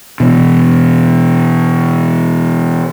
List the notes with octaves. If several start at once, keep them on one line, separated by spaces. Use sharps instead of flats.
B2 E3